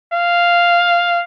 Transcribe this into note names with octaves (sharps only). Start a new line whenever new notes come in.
F5